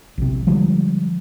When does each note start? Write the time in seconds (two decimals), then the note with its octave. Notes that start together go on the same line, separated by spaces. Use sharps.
0.18 A#1 C3
0.47 D3 F3 G3 G#3